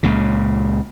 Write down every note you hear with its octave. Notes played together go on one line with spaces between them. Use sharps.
C#2 A#2 C#3